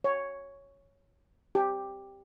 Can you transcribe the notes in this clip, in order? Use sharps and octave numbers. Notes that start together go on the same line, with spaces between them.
C#5
G4